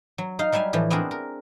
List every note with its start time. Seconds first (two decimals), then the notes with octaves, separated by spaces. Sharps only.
0.18 F#3
0.39 D#4 F5
0.52 F#3 G3 E5 F5 G#5
0.73 A2 E3 F3
0.90 B3 C4 D4 G#4 A#4
1.11 A#4